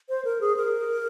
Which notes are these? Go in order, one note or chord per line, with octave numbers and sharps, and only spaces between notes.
C5
A#4
G#4
A#4